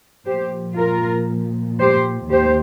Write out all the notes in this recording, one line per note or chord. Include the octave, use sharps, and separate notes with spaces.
A#2 F3 G4 C5
F4 A#4
G4 C5
D#2 D#3 G4 C5